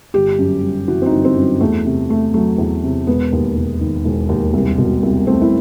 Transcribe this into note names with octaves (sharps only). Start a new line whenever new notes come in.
G1 G4
F#2
G3
E3 F#4
C4
D#4
G1
C4
F#2
E2 A3
C3
A3
F#3 A3
E2
C3
E1 B3
D#2
E1
D#3
E1
D#2
C2
B2
C2
A3 C4
E4